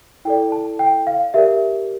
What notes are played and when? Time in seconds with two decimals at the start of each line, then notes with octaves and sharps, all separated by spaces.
0.25 E4 A4 D5 G5
0.52 A5
0.79 G5
1.07 F5
1.34 G4 A#4 D5 E5